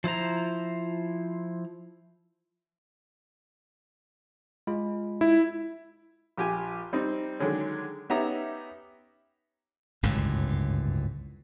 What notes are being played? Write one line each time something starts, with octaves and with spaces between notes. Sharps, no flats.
F3 E4 C5 A#5
G#3 F4 B5
E4
A#1 G4 G#5
G3 C4 D#4
D3 D#3 F#3 G#3 C#4
B3 C#4 D#4 G4 E5 A#5
G1 C#2 F#2 A2